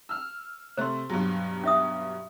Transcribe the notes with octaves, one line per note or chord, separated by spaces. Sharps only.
E6 F6
C3 A3 C5 C6
G2 B2 F#3
C#4 E5 D#6